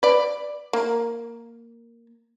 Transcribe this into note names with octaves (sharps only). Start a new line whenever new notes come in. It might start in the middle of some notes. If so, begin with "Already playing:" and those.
B4 D5
A#3